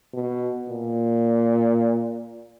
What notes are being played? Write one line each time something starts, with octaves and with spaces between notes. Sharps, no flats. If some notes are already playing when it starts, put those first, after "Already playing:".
B2
A#2